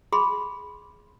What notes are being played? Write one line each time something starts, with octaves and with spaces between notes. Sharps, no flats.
G#4 B5 C6